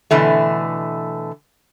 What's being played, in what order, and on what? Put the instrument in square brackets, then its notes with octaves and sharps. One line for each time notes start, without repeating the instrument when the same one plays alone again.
[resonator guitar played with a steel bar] B2 D3 E3 A3